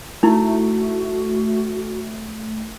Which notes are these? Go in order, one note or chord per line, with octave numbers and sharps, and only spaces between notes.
A3 D#4 E4 F#4